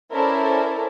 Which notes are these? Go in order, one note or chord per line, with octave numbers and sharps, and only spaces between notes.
C#4 E4 A4 A#4 C5 D5